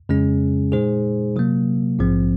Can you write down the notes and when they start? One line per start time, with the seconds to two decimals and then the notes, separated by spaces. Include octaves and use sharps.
0.09 F2 C#3 G#3 C#4 G#4
0.72 A#2 G#3 D#4 G#4 C5
1.36 C3 F#3 A#3
1.99 A#1 G#2 F3 C4